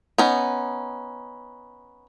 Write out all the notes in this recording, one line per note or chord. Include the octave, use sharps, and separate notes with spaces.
B3 C#4 D#4